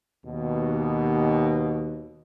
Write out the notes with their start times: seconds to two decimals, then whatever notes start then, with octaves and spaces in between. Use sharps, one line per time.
0.24 D#2 B2